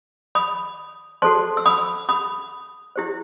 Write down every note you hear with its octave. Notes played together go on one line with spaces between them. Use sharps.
B5 D#6
F#4 A4 C5 A5 C6
E6
B5 D#6
B5 D#6
E4 G4 C5